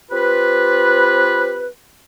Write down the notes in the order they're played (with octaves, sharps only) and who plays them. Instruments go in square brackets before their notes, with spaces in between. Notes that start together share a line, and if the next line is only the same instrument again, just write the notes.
[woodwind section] C4 F4 G4 B4